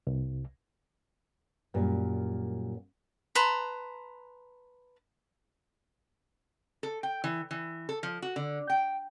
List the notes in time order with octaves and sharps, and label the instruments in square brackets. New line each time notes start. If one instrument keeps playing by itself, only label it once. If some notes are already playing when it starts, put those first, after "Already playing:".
[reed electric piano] C2
[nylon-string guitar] F#2 A#2 G3
[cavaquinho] B4 A5 A#5 C6
[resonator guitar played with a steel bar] A4
G5
E3
E3
A4
F3
F#4
D3
G5